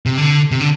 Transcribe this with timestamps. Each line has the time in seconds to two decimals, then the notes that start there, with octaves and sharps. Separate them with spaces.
0.06 C3
0.18 D3
0.51 C3
0.61 D3